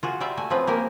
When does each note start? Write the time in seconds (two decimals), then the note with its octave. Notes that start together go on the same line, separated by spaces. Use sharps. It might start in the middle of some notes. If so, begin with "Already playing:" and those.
0.03 F4 F#4 G#4
0.20 G3 F4 D5 E5
0.37 A3 F#4 G#5
0.50 F3 C4 C#4 F4 G#4 B4
0.67 A#3 G4 A#4 G#5